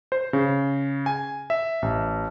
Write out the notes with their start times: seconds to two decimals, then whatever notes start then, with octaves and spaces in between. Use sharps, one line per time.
0.12 C5
0.33 C#3
1.06 G#5
1.50 E5
1.82 A1